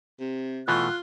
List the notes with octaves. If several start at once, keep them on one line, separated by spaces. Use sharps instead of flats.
C3
B2 E3 A3 F4 F#6